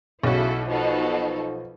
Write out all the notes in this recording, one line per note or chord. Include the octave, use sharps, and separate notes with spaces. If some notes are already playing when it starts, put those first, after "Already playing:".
B1 C#3 E4 F#4 A4
B2 F3 D#4 A4